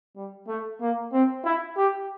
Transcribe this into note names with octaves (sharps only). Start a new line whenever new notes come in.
G3
A3
A#3
C4
E4
G4